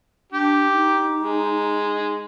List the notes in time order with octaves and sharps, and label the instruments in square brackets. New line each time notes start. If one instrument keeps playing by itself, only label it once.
[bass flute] D4 [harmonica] G4
[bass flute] D#4
[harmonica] G#3